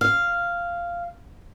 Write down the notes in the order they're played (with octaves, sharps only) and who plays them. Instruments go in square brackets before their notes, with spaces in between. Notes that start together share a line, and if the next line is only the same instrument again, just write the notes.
[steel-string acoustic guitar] F5